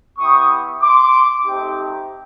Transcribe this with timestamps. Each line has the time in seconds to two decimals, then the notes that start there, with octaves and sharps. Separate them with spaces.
0.19 B3 E4 G4 C#6 D#6
0.82 C6 D6
1.46 A3 C4 D#4 G4